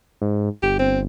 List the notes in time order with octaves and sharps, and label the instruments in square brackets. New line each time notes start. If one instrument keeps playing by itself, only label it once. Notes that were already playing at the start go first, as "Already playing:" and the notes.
[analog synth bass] G#2
[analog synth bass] G1 [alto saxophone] G4
[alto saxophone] C4